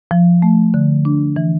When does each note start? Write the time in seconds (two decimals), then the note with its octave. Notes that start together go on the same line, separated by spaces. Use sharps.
0.11 F3
0.42 A3
0.74 D3
1.05 D4
1.36 E3